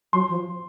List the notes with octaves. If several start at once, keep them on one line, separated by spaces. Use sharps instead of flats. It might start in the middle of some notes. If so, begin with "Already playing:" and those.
F#3 C6
F3